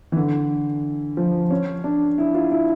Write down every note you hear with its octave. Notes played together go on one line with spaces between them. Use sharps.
E3
D3
F3
C#4
D4
E4
F4
E4